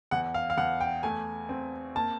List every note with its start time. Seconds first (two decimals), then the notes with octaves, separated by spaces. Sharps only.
0.11 E2 F#5
0.34 F5
0.50 F5
0.57 E2 F#5
0.80 G5
1.03 A3 G#5
1.49 C4
1.95 A#3 A5